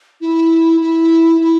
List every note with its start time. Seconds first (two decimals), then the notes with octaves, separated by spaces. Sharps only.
0.21 E4
0.81 E4
1.41 E4